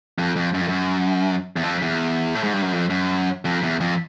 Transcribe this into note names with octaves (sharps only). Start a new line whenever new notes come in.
F2
F2
F#2
F2
F#2
E2
F2
E2
A2
G#2
G2
F#2
F2
F#2
F2
E2
F2